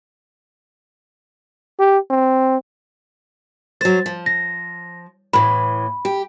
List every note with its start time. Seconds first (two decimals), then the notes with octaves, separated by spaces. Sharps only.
1.80 G4
2.10 C4
3.81 F#3 C5 A6
4.06 F3
4.26 A#6
5.33 A2 E3 B5
6.05 G4